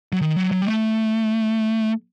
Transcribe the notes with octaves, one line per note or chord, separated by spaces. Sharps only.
F#3
D#3
F#3
F#3
G3
A3